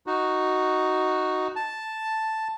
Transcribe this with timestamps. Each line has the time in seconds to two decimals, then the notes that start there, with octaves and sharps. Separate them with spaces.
0.07 D#4 F#4
1.56 A5